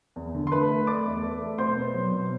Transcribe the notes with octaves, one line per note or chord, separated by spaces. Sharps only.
E2
D3
C6
A3 B4 B5
A3
A3 D5 D6
E2
A3
A3
B2 C5 C6
B3
F#3
B2